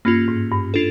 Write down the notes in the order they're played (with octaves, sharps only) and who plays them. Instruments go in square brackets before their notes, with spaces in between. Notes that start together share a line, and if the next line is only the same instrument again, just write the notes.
[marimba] G2 [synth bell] A#3 C#4 F4
[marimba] G#2
G2
[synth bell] D4 F4 A4